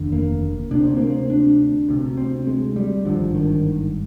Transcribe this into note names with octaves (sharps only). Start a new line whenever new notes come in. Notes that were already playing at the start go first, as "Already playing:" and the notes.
Already playing: F1 D#2 D3
A#3
D2 C3 D4
C4
A#3
C4
D4
D2 C3
C4
G#3
G3
G#1 G2 D3 F3
D#3